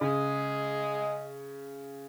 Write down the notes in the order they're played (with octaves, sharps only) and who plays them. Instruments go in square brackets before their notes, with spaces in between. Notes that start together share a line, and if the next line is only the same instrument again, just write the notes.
[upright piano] C#3 [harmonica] G#4 D#5